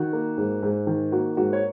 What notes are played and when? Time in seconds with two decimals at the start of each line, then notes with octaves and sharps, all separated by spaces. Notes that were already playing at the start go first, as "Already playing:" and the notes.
Already playing: D#3 F#4
0.13 A#3
0.38 G#2
0.63 G#2
0.87 D#3
1.12 A#3 F#4
1.37 G#2 F#4
1.53 C#5